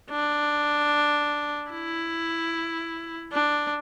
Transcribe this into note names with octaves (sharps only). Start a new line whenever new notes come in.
D4
E4
D4